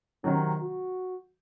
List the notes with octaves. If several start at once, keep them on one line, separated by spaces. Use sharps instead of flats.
C3 D#3 F#3 C#4
F#4